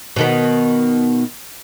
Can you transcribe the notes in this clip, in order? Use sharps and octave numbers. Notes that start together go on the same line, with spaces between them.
B2 D#3 B3